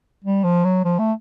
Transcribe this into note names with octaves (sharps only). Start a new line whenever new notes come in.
G3
F3
F#3
F3
A3